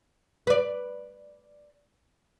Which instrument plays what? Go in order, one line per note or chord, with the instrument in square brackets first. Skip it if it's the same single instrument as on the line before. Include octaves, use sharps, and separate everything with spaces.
[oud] B4 D5